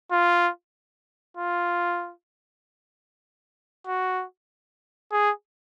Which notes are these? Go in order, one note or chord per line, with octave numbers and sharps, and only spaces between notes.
F4
F4
F#4
G#4